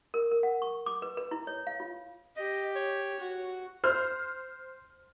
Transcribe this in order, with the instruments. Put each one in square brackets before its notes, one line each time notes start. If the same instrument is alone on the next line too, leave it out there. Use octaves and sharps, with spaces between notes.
[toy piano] A#4
A#4
F#5
C#6
D6
B4
B4
E4
C#5
F5
F4
[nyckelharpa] G4 [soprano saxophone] D#5
[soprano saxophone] C#5
[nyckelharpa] F#4
[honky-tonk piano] C5 F6